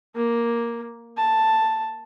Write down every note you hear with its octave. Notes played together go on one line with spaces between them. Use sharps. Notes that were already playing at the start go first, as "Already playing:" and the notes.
A#3
A5